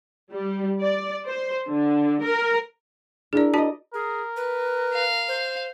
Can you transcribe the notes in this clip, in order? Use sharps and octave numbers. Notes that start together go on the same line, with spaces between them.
G3
D5
C5
D3
A#4
D4 E4 G#4 A#4 D5
D4 F#4 D5 D#5 A5
G#4 A#4
B4
F5
C5